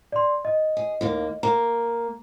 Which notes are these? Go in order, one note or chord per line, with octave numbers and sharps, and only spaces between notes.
D5 C6
D#5
G#4
D#2 A#3
A#3 A#5